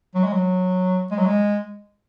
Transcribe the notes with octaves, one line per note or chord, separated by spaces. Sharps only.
F#3
G#3
F#3
G#3
F#3
G#3